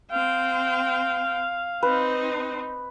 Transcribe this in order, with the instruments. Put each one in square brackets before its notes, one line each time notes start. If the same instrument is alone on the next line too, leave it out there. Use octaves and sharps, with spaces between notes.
[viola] C4 G5 [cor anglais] F5
[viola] C4 D#4 [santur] B4